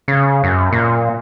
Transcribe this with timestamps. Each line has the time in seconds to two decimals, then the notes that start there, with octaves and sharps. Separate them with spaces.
0.08 C#3
0.44 F#2
0.73 A#2